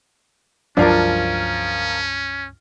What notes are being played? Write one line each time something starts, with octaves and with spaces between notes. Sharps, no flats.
C#2 G2 F3 F#3 C#4 D4 F4 A#4